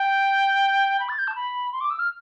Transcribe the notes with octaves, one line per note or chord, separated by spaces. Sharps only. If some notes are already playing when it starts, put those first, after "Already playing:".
Already playing: G5
B5
A6
G6
A5
B5
C6
D6
E6
F6